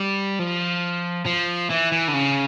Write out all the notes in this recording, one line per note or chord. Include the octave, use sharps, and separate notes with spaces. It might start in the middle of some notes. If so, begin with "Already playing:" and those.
Already playing: G3
F3
F3
E3
E3
D3
C#3